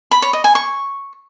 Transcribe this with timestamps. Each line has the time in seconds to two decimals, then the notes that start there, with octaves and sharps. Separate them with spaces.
0.11 B5
0.22 C#5
0.33 D#5
0.44 G#5
0.55 C#6